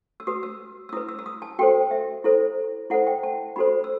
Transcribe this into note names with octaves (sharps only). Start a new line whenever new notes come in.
E6
F#4 B4 D#6
E6
E6
E4 B4 D#6
E6
E6
D#6
A5
F#4 A4 C5 G5
E5
E4 A4 C5
E4 A4 C5 F#5
G5
A5
D#4 F#4 A4 C5 B5
E6